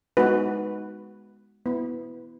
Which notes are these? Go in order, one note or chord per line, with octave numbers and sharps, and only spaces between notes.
G#3 B3 D#4 F#4 B4
B3 E4